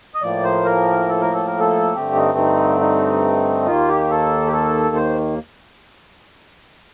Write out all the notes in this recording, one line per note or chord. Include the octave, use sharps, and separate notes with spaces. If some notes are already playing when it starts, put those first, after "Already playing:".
D#5
A2 F3 A#3 D5
C5
A#4
A4
A#4
A4
A#4
A4
G2 D3 A3 C4 G4
D#4
D#4
D#4
D#2 D#3 A#3 F4
G4
A4
G4
A4
C5